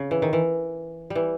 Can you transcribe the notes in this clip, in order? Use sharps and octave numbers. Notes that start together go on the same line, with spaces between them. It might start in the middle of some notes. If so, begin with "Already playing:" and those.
Already playing: C#3
E3
D#3
E3
G3
E3